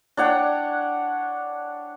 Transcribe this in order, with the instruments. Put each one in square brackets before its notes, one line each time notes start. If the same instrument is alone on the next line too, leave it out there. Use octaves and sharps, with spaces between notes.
[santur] D4 C#5 F#5 G5